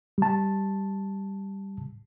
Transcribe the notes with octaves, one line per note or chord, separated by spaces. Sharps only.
G3 A5